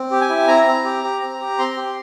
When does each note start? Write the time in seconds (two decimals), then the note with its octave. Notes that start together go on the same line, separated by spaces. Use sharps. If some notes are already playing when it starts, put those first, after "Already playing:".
Already playing: C4
0.11 G4
0.21 G#5
0.29 E4
0.47 C4 A#5
0.66 C4
0.85 G4
1.04 G4
1.22 C4
1.40 G4
1.59 C4 C6
1.77 G4